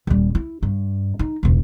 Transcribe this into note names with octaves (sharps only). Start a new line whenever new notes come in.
D#1 G3
E4
G2
D#4
E1 C#2